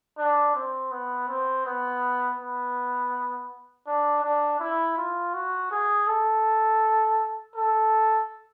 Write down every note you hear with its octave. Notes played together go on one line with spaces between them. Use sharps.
D4
C4
B3
C4
B3
B3
D4
D4
E4
F4
F#4
G#4
A4
A4